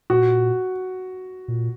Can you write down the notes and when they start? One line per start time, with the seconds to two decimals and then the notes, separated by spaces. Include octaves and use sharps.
0.10 A#2 F#4
1.48 A#2